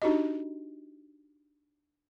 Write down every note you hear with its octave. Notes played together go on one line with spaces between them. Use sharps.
D4 D#4 F#4 G4 D#5